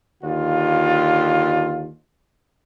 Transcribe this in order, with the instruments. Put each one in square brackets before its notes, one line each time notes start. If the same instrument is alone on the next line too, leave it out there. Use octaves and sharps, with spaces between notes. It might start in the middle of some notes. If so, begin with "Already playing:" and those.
[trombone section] D#2 D3 F4